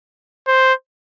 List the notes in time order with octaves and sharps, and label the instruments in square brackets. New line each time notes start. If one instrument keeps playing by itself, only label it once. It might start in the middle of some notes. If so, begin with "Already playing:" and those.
[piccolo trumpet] C5